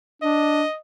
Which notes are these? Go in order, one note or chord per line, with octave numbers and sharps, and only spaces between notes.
D4 D#5